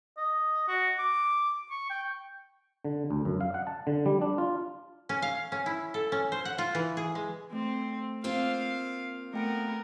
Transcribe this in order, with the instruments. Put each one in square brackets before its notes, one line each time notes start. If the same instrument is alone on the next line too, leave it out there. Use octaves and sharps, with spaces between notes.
[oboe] D#5
F#4
D6
C#6
G5
[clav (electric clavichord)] D3
D2
F#2
F5
F#5
A5
D3
G3
D4
F4
[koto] C#4
F5
C#4
E4
A4
C#4
C5
F#5
F4
E3
G#4
G#3
[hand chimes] A3 [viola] C4
[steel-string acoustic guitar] A#3 C4 F4 [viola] F5
[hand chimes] A3 G5 D7 [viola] B3 A#4